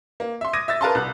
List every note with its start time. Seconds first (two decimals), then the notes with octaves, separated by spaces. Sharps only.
0.20 A#3
0.41 E5 C6
0.53 D6 D#6 G#6 A#6 D#7
0.68 E5 E6 A6 A#6
0.81 A#4 B4 F5 A5 A#5 C6
0.95 C2 F#6